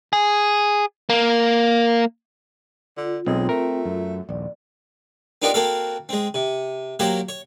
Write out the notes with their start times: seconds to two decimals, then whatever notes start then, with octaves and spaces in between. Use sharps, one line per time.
0.13 G#4
1.10 A#3
2.97 D3 F4
3.26 B1 G#3 C4
3.49 A3 A#4
3.85 F#2
4.29 D#1 A#1 D5
5.42 B3 D4 D#4 F4 G4 A#4
5.54 A#3 C4 F#4 A4 F5
6.09 G#3 C4
6.34 C3
6.99 F#3 A#3 G4 C5 C#5
7.29 C#5